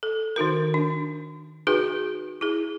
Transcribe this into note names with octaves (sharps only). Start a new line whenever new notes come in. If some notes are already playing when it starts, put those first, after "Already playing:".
A4
D#3 D#4 F#4 A#4
D4
D#4 F#4 G#4 B4
E4 G#4